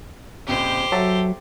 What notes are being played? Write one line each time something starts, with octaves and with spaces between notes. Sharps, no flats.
A#1 F2 C#3 G4 C5
F#3 A4 E5 A6